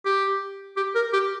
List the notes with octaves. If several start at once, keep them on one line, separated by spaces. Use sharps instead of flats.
G4
G4
A#4
G4